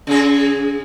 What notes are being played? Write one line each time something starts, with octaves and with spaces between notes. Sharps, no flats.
C#3 G#4